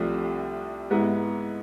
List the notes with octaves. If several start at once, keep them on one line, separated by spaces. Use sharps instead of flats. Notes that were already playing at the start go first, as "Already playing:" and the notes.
Already playing: C2 C3 F3 A3 D4
G#2 G#3 B3 E4